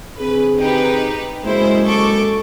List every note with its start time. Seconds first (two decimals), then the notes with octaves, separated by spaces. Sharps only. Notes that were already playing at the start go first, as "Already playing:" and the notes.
0.20 D3 C4 G#4 B4
0.57 D#4 G4 B4
1.44 F#1 G#3 E4 C5
1.85 A4 C#6 D6